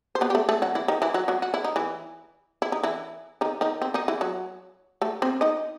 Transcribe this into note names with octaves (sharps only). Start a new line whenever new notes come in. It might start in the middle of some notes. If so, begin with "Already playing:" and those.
C5
B3 B4
G4
A3 A4
A3 A4
F#3 F#4
E3 E4
D#3 D#4
E3 E4
F#3 F#4
F#3 F#4
F#4
E4
D#4
E3 E4
E4
D#4
E3 E4
D#3 D#4
D#3 D#4
C4
D#3 D#4
E3 E4
F#3 F#4
A3 A4
C4 C5
D#4 D#5